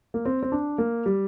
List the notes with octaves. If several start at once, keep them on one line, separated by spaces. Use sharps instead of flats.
A#3
C4
C4
D4
A#3
G3